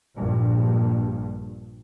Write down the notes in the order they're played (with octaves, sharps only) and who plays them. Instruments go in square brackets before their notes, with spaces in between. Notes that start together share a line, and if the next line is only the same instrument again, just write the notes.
[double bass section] A#1 G2 A#2